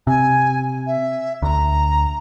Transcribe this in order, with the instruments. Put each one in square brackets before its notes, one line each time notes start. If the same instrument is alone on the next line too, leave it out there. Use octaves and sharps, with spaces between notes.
[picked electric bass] C3 [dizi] G#5
[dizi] E5
[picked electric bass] D2 [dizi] A#5